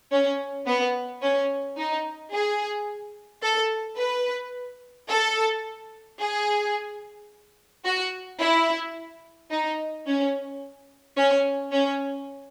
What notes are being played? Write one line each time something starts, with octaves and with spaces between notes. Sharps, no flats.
C#4
B3
C#4
D#4
G#4
A4
B4
A4
G#4
F#4
E4
D#4
C#4
C#4
C#4